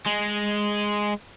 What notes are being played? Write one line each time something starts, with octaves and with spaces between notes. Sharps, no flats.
G#3